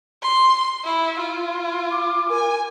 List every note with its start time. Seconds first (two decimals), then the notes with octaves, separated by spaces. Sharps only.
0.23 C6
0.84 E4
1.20 F4
1.91 D6
2.30 A#4 G#5